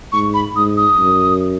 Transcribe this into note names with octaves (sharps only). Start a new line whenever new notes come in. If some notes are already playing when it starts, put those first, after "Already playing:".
G#2 C#6
B5
G#2 D#6
D#6
F#2